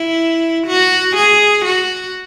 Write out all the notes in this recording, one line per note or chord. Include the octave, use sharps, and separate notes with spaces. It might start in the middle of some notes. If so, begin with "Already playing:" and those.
Already playing: E4
F#4
G#4
F#4